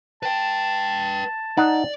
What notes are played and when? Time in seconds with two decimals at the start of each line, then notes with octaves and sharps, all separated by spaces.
0.23 B4 G5 A5
1.57 D#4 D5 F#5